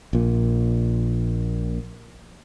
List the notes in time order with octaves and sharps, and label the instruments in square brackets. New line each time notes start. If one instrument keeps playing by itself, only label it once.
[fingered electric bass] A#1 A#2